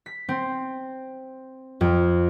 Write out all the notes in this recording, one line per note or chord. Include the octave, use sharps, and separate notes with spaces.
B6
C4
F2